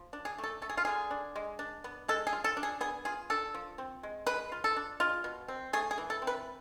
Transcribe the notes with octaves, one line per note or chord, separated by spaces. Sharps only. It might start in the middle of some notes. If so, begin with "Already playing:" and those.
Already playing: F3
D4
G#4
A3
A4
A3 A4
G#4
F4
D3 G#4
D4
G#3
D4
B3
G#3 A4
G#4
F4
A4
D4
G#4
B3 G#4
F4 G#4
D4 A4
F3
C4
G#3
G#3 B4
F4
A4
D4
G#3 F4
B2
C4
A3 G#4
G#4
E3
A4
C4
B4